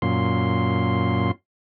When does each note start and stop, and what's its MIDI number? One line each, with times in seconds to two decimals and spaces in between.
0.02 1.31 42
0.02 1.31 46
0.02 1.31 84